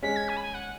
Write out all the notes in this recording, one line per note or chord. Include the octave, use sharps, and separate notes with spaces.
G#3 C#4 B6
G#6
G#5
B5
G#5
F#5